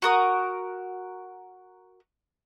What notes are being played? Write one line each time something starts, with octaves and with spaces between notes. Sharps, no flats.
F#4 A#4 D#6